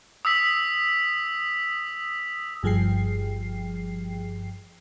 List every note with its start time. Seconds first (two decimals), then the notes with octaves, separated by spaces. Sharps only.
0.25 D#6 E6 B6
2.63 G1 G2 F3 G#4 G5 C7